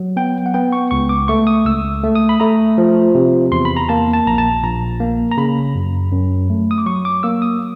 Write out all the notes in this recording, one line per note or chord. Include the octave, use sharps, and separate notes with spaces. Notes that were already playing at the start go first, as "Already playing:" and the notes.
Already playing: F#3
B3 G5
F#5
B3 G5
C#6
C#2 C#6
D6
A3 C#6
D#6
C#2 E6
A3
D#6
B5
A3 A#5
F3
C3
E2 C6
B5
A#5
A#3 A5
A5
A#1 A#5
A5
A#1 A#5
A#3
A#5
C#3 B5
F#2
F#2
A3
D#6
D6
F#3 C#6
D6
A#3 E6
D#6